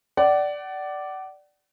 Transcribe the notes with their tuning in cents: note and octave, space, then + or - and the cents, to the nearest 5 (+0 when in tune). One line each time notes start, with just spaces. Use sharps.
D5 +0 F#5 +35